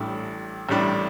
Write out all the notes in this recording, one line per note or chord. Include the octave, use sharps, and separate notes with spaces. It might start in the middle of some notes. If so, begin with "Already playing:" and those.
Already playing: A1 A2 G3 D4
A1 A2 G3 D4